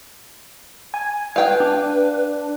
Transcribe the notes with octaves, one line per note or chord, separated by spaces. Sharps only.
G#5
B4 F5 G5
D4